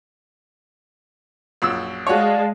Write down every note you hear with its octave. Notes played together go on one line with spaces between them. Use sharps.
A#1 F#2 E6
G#3 F#4 C#5 D5 F5 A5